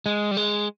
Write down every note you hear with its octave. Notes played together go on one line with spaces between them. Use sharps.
G#3
G3
G#3